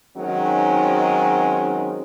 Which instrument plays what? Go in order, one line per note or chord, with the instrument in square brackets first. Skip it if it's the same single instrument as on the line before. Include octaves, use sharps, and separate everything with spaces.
[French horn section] D#3 F#3 G#3 C4 C#4 D#4